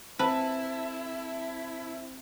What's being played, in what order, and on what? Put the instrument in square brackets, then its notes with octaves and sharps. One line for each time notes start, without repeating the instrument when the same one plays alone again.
[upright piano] C4 [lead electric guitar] E4 [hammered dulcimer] A4 [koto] B4